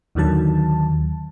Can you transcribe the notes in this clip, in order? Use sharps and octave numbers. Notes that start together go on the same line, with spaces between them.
D#2 D3 D#3 F#3 A5